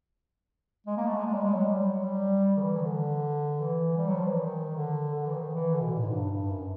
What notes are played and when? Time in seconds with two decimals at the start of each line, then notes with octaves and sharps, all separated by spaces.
0.87 G#3
0.97 A#3
1.07 A3
1.16 G#3
1.27 G#3
1.35 G3
1.44 G#3
1.55 F#3
1.65 G3
1.84 F#3
2.04 G3
2.57 D#3
2.62 E3
2.77 D#3
2.82 D3
3.60 E3
3.97 G3
4.07 F#3
4.17 F3
4.26 E3
4.38 D#3
4.76 D3
5.14 D3
5.26 E3
5.34 D#3
5.54 E3
5.73 D3
5.81 B2
5.90 A#2
5.96 A2
6.04 G#2
6.12 G2
6.32 G2
6.50 F#2